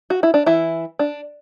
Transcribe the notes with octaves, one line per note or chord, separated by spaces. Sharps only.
F#4
E4
D4
E3 E4
D4